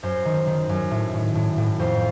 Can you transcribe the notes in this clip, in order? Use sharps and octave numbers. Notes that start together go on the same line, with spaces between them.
F#2 C5
D#3
D#3
F#2
A2
A2
A2
A2
F2 C5